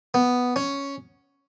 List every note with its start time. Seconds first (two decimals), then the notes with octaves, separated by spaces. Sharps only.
0.14 B3
0.56 C#4